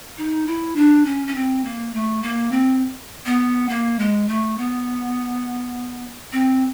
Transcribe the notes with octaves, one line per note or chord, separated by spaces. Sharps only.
D#4
E4
D4
C#4
C#4
C4
A#3
A3
A#3
C4
B3
A#3
G#3
A3
B3
C4